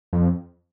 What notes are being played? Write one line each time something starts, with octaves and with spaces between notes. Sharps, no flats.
F2